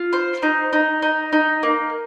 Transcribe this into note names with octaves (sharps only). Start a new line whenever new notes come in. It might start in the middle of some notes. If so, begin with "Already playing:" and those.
Already playing: F4
C5
D#4
D#4
D#4
D#4
A#3